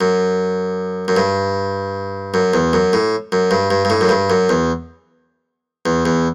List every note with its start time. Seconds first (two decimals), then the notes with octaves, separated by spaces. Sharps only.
0.01 F#2
1.08 F#2
1.17 G2
2.34 F#2
2.54 E2
2.73 F#2
2.93 A2
3.32 F#2
3.51 G2
3.71 G2
3.85 G2
3.90 A2
4.01 F#2
4.09 G2
4.30 F#2
4.49 E2
5.86 E2
6.06 E2